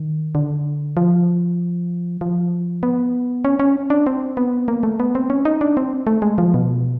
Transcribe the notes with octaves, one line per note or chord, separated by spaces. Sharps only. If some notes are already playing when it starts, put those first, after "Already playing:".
Already playing: D#3
D3
F3
F3
B3
C#4
C#4
D4
C4
B3
A#3
A3
B3
C4
C#4
D#4
D4
C4
A3
G#3
F3
B2